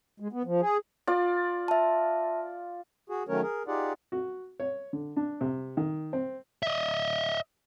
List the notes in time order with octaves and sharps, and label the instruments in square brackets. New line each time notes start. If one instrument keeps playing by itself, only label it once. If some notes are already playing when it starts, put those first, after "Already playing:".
[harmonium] G#3
B3
F3
G#4
[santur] F4 D5
[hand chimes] E5 A5
[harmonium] F#4 G#4
D#3 F#3 A3 C#4 A#4 C#5
G#4 A#4
D#4 F4 G4 G#4 D5 F#5
[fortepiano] F#4
C#5
D3
D4
C3
D#3
C4
[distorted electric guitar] D#5 E5